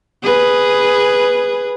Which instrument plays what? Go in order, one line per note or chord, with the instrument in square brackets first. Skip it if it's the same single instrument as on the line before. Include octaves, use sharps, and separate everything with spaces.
[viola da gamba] G#4 B4